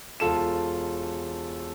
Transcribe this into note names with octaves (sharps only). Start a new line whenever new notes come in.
E1 F4 A4 E7